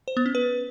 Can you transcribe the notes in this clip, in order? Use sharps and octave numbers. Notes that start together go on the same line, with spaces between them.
C5
B3
C#4
B4